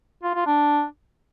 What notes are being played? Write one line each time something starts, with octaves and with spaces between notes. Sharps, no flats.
F4
F4
D4